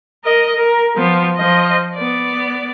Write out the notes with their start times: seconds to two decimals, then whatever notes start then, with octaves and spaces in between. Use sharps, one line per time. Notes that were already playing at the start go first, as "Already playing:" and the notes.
0.24 A#4 D#5
0.55 A#4
0.97 F3 B3
1.36 F3 D#5
1.95 B3 D5